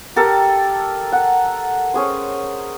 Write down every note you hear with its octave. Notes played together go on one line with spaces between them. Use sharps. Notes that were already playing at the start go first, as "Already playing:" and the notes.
G4 A4 A#4
F#5
C#4 G#4 C5